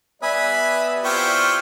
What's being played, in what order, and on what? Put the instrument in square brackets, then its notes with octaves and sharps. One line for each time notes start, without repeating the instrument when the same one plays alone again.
[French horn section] G3 B3 D5 [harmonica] B4 [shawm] E5 [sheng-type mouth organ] G#5 B5 D#6
[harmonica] C4 E4 G4 [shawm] F4 [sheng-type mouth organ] G5 C#6